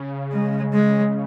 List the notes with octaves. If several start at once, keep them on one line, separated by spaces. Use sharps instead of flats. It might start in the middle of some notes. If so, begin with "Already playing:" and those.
Already playing: C#3
G#3
G#3